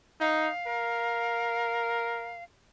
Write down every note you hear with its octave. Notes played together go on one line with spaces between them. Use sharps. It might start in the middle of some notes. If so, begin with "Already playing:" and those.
D#4 F5
A#4